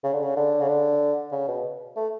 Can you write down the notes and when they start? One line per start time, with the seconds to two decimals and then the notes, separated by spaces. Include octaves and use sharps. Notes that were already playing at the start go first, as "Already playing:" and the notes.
0.03 C#3
0.13 D3
0.22 C#3
0.36 D3
0.61 C#3
0.68 D3
1.32 C#3
1.48 B2
1.96 A3